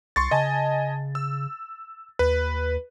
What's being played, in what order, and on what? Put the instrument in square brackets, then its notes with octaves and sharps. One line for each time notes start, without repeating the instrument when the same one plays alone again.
[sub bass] C2 [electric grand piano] C6 C#6 A6
[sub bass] C#3 [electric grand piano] D#5 G#5 A5
[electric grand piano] E6
[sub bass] D#2 [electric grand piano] B4